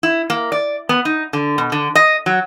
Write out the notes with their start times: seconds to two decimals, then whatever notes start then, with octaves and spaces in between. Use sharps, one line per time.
0.03 E4
0.30 A#3
0.52 D5
0.89 B3
1.05 D#4
1.33 D3
1.58 B2
1.72 D3
1.95 D#5
2.26 F#3